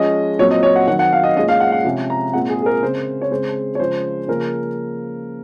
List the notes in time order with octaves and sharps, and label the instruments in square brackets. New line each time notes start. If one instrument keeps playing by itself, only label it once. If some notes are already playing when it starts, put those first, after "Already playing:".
Already playing: [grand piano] F3 G#3 C#4 D#5
A#2 F#3 C4 C#5
D#5
C#5
F#5
D#3 F#3 C4 F#5
F#5
F5
D#5
A#2 G#3 C#4 D#5
F5
F#5
F#5
C3 F3 G#3 C#4
A#5
A#2 G#3 C4 F#5
G#4
G#4
A#4
C#3 G#3 C4 C5
C#5
C#3 G#3 C4 C5
C#5
C#3 F3 G#3 C5
C#3 F3 A#3 C#4 A#4